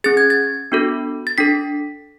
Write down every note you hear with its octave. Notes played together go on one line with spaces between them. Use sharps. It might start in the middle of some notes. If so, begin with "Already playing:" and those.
C#4 G#4 A6
G#6
A6
B3 D4 F#4 A4
A6
D4 A4 B6